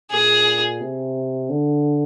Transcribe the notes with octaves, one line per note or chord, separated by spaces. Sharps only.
A#2 G#4
C3
D3